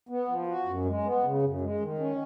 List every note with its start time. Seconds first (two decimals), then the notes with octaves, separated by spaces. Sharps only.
0.09 B3
0.28 F3
0.47 F#4
0.66 F#2
0.85 G#3
1.04 B3
1.23 C#3
1.42 F#2
1.61 G#3
1.80 D#3
1.99 C#4